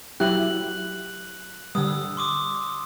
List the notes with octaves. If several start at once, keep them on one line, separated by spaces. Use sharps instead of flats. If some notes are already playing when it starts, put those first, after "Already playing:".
F#3 E4 G4 F#6 F#7
D3 G3 D#6 E6
C6 D6 D#6